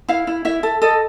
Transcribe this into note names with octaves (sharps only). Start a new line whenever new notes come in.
E4 F5
E4
E4 E5
A4
A4 D#5